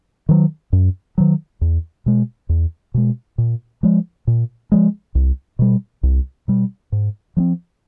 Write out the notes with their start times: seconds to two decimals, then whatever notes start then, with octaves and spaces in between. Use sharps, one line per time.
0.29 D#3 F#3
0.73 F#2
1.18 D#3 F#3
1.61 E2
2.06 B2 G#3
2.49 E2
2.94 B2 G#3
3.38 A#2
3.83 F3 G#3
4.27 A#2
4.72 F3 G#3
5.15 C2
5.59 B2 G3
6.03 C2
6.48 B2 G3
6.92 G#2
7.37 F3 G#3 C4